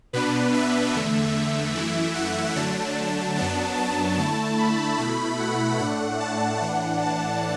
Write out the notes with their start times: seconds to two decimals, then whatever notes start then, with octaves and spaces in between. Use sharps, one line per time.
0.13 B2 B3 D4 B4
0.53 E5
0.94 E2 D3 A3
1.75 F#2 E3 A3 E4
2.15 F#5
2.55 D3 F#3 A3 D4 A5
3.37 F#2 F#3 B3 D4
3.77 A5
4.17 D3 A3 E4
4.58 B5
4.98 B2 A3 E4
5.39 F#5
5.79 A2 A3 D4
6.20 A5
6.60 A2 E3 D4 F#5
7.01 A5